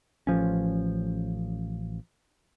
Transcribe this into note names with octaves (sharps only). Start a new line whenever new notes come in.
A1 F3 C#4